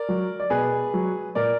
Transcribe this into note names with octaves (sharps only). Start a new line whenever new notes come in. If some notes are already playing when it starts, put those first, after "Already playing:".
Already playing: A#4 D5
F#3
D5
B2 G#4 B4
F#3
A#2 A#4 D5